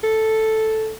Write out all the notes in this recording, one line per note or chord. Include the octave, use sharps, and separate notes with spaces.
A4